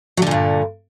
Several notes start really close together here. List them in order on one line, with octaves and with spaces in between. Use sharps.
F#3 D3 A#2 G2